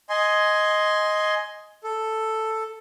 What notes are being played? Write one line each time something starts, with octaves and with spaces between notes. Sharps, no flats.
D#5 G#5 C6
A4